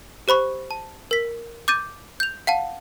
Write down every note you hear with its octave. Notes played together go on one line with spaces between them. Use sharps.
G4 C5 B5 C#6
A5
A#4 B6
D6 G6 A6 D#7
G6 F7
F5 F#5 A5